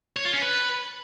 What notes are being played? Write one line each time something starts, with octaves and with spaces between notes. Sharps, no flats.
C#5
F4
C#4
B4